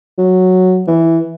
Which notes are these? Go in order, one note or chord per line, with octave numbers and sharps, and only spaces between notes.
F#3
E3